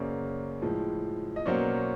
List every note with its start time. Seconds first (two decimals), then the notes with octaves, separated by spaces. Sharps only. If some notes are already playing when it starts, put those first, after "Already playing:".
Already playing: F#2 C#3 F#3 A#3 C#4 C5 D5
0.61 A2 F3 G#3
1.36 D#5
1.46 B2 F#3 A#3 C#4 C5 D5